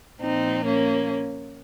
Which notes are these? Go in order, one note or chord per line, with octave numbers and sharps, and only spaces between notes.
A#2 F3 C4 D#4
A#3 C#4